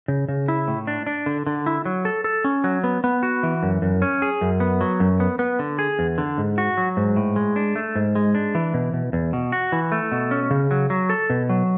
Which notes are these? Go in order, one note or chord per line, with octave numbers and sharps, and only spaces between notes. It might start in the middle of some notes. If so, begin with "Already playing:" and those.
C#3
C#3
E4
A2
D4
D4
D3
D3
E4
F#3
A4
A4
C#4
F#3
B3
B3
F#4
E3
F#2
F#2
C#4
G#4
F#2
B3
F#3
F#2
B3
B3
D3
G#4
E2
D3
G#2
F#4
F#3
G#2
A2
G#3
D4
A3
G#2
G#3
D4
E3
B2
B2
E2
B2
F#4
E3
A3
B2
C#4
C#3
F#3
F#3
A4
B2
F#3